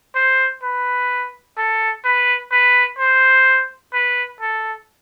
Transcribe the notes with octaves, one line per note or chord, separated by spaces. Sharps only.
C5
B4
A4
B4
B4
C5
B4
A4